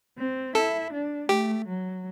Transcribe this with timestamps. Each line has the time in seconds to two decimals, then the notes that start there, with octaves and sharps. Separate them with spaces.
0.17 C4
0.55 E4 A4
0.92 D4
1.29 A3 G4
1.67 F#3